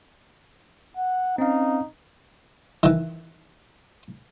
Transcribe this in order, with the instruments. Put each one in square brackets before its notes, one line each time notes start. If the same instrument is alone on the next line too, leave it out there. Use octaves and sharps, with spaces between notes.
[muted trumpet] F#5
[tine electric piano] C4 C#4 F5 [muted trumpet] D#4
[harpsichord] D#3 E3